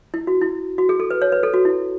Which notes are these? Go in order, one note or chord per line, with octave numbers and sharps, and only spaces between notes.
E4
F#4
E4
F#4
G#4
A4
B4
C#5
B4
A4
F#4
E4